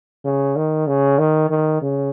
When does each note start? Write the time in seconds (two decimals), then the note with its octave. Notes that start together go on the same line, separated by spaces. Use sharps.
0.25 C#3
0.56 D#3
0.87 C#3
1.19 D#3
1.50 D#3
1.82 C#3